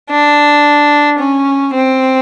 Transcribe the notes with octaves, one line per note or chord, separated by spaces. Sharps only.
D4
C#4
C4